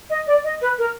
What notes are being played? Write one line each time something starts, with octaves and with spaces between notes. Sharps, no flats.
D#5
D5
D#5
B4
A#4